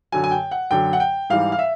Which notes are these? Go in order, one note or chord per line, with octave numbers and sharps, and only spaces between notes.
F#2 D3 F#3 G#5
G#5
G5
F#5
F#2 D3 F#3 G5
F#5
G5
G#2 E3 G3 F5
F5
E5